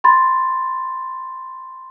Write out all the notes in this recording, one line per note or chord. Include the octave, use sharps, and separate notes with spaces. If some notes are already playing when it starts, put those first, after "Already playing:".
B5 C6 A6